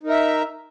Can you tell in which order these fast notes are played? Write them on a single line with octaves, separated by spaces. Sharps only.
D#4 A#4 E5